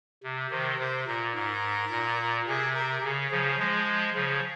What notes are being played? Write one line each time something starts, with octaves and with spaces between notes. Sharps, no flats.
C3
C3 D#3 C5
C3 C5
A#2 A#4
G#2 A#4
A#2
C3 G#4
A#4
C#3 G#4
C#3 F3
F3 G#3
C#3 F3 G#4